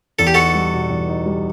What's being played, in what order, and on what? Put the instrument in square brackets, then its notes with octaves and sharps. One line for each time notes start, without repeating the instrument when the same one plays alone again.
[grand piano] E2 [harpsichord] A4
[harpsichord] G4
[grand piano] D#4 [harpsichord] F#4 A4
[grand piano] G3
B2
E2
D#4
G3